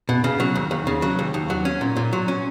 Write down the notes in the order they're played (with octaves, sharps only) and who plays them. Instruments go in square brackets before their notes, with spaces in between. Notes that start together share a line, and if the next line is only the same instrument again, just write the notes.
[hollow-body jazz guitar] B2
C#3
F#3
D#2
D#2
C#3
F#3
D#2
D#2
F#3
C#4
A#2
A#2
F#3
C#4